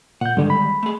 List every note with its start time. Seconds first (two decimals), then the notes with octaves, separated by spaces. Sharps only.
0.21 A#2 F#5 G6
0.37 G2 D3 D#3 G3 G#3
0.50 B5
0.83 A3 G#4